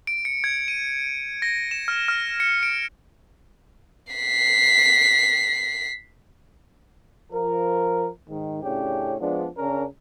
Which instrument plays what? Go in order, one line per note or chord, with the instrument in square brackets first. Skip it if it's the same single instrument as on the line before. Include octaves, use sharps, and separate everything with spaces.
[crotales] D7
C#7
G#6
D#7
A#6
E7
F6
F6
C#7
D7
[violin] B6 C7
[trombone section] F3 A#4
G#2 D#3
A2 C#3 C#4 D4 G4
F3 G#3 B3 D4
C#3 C#4 D4 A#4